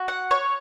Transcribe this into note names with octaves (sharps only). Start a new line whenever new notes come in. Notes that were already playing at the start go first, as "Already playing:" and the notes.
Already playing: F#4
F#5
C#5